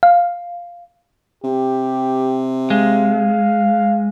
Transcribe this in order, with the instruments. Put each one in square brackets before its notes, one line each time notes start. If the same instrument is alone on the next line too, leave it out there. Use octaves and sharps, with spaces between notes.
[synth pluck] F5
[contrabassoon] C3 [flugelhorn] G4
[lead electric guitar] G#3 [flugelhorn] F5